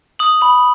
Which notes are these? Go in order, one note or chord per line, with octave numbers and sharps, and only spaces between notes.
D#6 F#7
B5 F#7